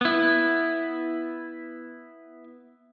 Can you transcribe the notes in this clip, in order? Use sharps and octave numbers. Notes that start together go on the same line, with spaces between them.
B3 E4